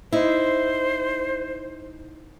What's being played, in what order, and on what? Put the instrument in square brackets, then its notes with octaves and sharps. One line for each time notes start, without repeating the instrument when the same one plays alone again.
[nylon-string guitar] D#4 E4 [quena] C5